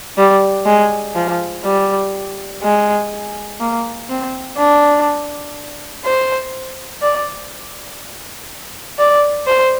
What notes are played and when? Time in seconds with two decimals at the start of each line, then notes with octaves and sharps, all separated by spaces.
0.18 G3
0.66 G#3
1.15 F3
1.64 G3
2.63 G#3
3.60 A#3
4.09 C4
4.58 D4
6.05 C5
7.03 D5
8.99 D5
9.47 C5